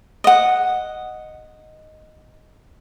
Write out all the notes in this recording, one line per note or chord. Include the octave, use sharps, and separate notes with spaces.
D#5 F#5